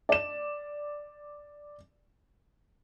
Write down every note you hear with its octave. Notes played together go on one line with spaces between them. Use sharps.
D5 E7